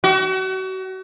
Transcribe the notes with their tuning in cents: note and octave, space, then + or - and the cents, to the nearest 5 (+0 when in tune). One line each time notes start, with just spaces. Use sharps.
F#4 +35